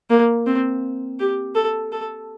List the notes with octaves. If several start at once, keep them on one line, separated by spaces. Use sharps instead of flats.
A#3
C4
G4
A4
A4